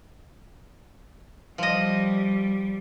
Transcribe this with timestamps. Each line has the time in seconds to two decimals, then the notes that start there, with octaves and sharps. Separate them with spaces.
1.58 F3 G3 D#5